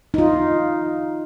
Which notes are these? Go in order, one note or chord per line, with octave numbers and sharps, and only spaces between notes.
D#4 F4